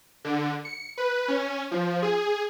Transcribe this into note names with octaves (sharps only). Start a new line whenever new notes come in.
D3
C#7
B4
C#4
F3
G#4